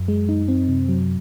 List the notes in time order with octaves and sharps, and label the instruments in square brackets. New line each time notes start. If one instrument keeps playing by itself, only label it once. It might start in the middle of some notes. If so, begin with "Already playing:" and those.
Already playing: [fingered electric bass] F#2
[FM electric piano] G#3
D#4
C4
C3
F#3